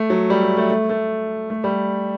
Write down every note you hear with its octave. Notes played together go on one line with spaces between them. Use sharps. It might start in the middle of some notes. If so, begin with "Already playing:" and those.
Already playing: A3
F#3
G3
A3
A3
A3
A3
A3
G3